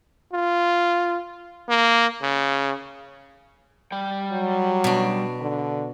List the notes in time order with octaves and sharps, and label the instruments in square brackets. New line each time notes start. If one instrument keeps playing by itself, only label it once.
[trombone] F4
A#3
C#3
[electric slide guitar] G3 G5
[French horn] F#3
[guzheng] B2 D4
[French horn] D3